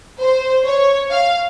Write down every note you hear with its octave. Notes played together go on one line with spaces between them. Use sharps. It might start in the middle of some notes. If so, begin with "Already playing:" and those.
C5
C#5
F5